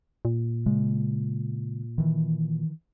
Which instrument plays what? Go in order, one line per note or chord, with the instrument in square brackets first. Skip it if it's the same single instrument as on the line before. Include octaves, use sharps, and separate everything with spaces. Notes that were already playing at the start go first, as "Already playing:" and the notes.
[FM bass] A#2
[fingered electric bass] C#3 G#3
D#3 E3